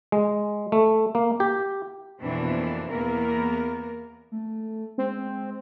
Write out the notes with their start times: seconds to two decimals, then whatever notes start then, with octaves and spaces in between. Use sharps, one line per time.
0.12 G#3
0.72 A3
1.15 A#3
1.40 G4
2.21 F2 B2 E3 A#3 C4 D4
2.91 E2 E3 A#3 B3 A#4
4.32 A3
4.98 G#3 C4